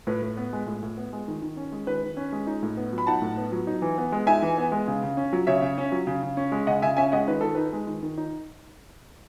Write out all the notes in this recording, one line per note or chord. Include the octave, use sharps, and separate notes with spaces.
A2 B4
A2
B3
G#3
A2
A2
B3
G#3
D#3
D#3
C#4
G#3
D#3 B4
D#3
C#4
G#3
D#4
A2
B3
F#3
B5
D#4 F#5 A5
A2
B3
F#3
D#4
E3
B3
G#3
D#4 E5 G#5
E3
B3
G#3
C#3
C#3
C#4
F#3
C#3 C#5 E5
C#3
C#4
F#3
C#3
C#3
C#4
G#3
C#3 D#5 F#5
C#3 E5 G#5
C#4 E5 G#5
G#3 D#5 F#5
D#3 B4
D#3 A4
D#4 B4
G#3
D#3
D#3
D#4